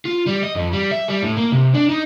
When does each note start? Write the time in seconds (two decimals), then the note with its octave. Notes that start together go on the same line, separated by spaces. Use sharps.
0.05 F4
0.27 G3
0.43 D#5
0.55 F2
0.73 G3
0.91 E5
1.08 G3
1.22 A2
1.37 A#3
1.52 C3
1.74 D4
1.89 D#4